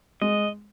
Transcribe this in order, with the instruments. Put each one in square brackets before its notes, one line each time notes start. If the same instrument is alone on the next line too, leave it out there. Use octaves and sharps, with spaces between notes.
[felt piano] G#3 [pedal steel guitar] D#5